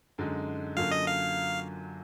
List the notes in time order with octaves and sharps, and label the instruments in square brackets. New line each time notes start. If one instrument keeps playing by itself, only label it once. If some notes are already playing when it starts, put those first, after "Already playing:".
[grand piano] F#2 D3 G#3 D#4
[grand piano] F#2 D3 F#3 A#3 F4 [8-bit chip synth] F5
[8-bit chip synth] D#5
F5